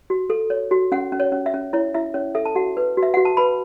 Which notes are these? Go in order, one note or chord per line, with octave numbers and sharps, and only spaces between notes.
F#4
A4
C#5
F#4
C#4 F#5
C#4
C#5
C#4
E5
C#4
E4 C#5
E4 E5
C#4 C#5
A4 E5
A5
F#4 F#5
B4
F#4
E5
F#4 F#5
A5
B4 B5